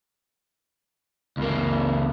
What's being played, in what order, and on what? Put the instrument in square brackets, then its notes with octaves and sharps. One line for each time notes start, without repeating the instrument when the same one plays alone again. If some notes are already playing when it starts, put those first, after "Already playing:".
[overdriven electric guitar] C#2 A#3